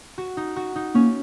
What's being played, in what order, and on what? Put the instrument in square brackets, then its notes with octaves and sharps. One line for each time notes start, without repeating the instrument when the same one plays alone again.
[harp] F#4
D#4
F#4
D#4
[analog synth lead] A#3 [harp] C#4